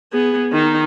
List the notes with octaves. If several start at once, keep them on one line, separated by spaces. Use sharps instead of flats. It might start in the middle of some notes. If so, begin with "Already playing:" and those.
B3 G#4
D#3 D#4